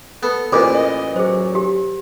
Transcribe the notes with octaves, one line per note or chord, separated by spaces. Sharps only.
B3 A4
A1 E2 A#2 B4 C5 D6
D#5
F#3 G#4 C5
G4